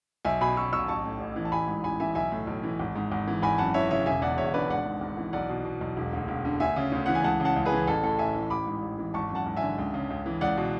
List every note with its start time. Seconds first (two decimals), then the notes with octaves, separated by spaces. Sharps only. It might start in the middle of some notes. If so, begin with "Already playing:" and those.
0.25 B1 E5 G#5
0.41 B2 G#5 B5
0.56 B2 C#6 E6
0.73 B1 C#6 E6
0.88 A1 A5 C#6
1.05 A2
1.20 A1
1.36 E3
1.45 A5
1.52 A1 G#5 B5
1.68 G#2
1.84 A1 G#5 B5
2.00 E3 E5 G#5
2.15 B1 E5 G#5
2.32 A2
2.47 B1
2.63 E3
2.79 G#1
2.95 G#2
3.12 G#1
3.27 E3
3.42 G#1 G#5 B5
3.58 F#2 F#5 A5
3.74 E3 C#5 E5
3.90 C#3 C#5 E5
4.06 E1 E5 G#5
4.22 E2 D5 F#5
4.38 E1 C#5 E5
4.54 D3 B4 D5
4.69 G#1 D5 F#5
4.86 G#2
5.01 G#1
5.17 E3
5.33 B1 D5 F#5
5.49 B2
5.65 B2
5.81 B1
5.97 E1
6.13 D2
6.28 E1
6.45 D3
6.60 D2 E5 G#5
6.76 C#3
6.92 D2
7.06 E3 F#5
7.15 G#5
7.24 C#2 F#5 A5
7.40 C#3
7.45 F#5 A5
7.56 C#2
7.66 G#4 B4
7.72 E3
7.87 A1 A4
8.03 A2 A4
8.19 A1 E5 G#5
8.35 E3
8.50 A1 B5 D6
8.66 G#2
8.82 A1
8.98 E3
9.14 G#1 A5 C#6
9.30 F#2
9.35 F#5 A5
9.46 G#1
9.57 E5 G#5
9.62 D3
9.78 C#2
9.94 C#3
10.10 C#2
10.26 E3
10.41 C#2 D5 F#5
10.57 B2